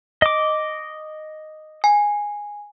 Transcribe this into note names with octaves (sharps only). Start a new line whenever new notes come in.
D#5 D6
G#5